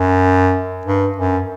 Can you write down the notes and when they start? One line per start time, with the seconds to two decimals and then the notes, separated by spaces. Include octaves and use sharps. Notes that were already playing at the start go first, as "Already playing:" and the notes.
Already playing: F#2
0.86 G2
1.17 F#2